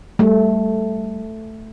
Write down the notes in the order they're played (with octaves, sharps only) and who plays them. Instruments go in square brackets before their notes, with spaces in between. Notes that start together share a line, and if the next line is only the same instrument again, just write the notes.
[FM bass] G3 [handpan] A3